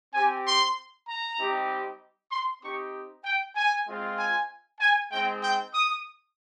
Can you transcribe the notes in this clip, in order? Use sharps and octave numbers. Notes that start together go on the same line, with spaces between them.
C4 G4 G#5
C6
A#5
G3 C4 D#4 G4
C6
C4 D#4 G4 C#6
G5
G#5
G#3 C4 F4
G#5
G#5
G#3 C4 D#4 G5
G5
D#6